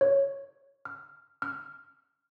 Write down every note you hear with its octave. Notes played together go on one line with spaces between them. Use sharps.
C#5
F6
F6